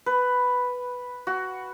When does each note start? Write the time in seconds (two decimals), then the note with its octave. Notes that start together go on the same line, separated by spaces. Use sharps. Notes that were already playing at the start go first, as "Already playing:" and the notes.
0.06 B4
1.27 F#4